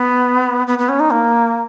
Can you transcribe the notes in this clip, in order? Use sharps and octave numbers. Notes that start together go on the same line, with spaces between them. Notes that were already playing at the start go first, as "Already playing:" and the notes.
Already playing: B3
B3
B3
C#4
D#4
A#3